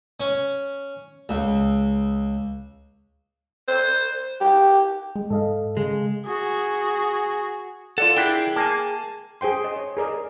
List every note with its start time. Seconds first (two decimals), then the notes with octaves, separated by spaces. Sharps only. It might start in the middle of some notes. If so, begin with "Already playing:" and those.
0.20 C#4
1.29 C#2
3.68 C5
4.41 G4
5.16 G#3
5.30 G#2 A4 D#5 F5
5.77 C#3 G#3
6.25 F#4 G#4
7.98 F4 A4 D5 F#5
8.17 D4 E4 G#4 A#4 E5 G5
8.56 A#3 G#5 A5
9.41 G#4 C5 G5 C6
9.64 D#5
9.76 C#5
9.97 G#4 A#4 D5 D#5